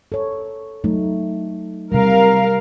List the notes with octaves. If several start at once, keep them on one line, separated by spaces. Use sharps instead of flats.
A4 C#5
F#3 A3 D#4
C3 G3 A#4 F5